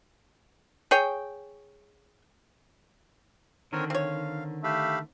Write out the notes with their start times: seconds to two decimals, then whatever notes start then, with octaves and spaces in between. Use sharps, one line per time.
0.91 G#4 C#5 G5
3.73 D3 D#3 C4 A#4 C#5
3.90 C4 C#5 F5
4.64 A3 G4 F5 B5